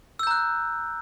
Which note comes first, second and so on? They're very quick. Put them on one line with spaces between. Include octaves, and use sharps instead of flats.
E6 G6 A#5 F#6